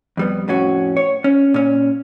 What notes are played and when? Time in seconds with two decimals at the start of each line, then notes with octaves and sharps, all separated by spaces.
0.17 F2 G3 B3
0.48 F2 A2 C#4 F#4
0.97 C#5
1.24 C#4
1.54 A#2 C#4